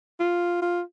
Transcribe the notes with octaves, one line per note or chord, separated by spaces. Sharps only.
F4
F4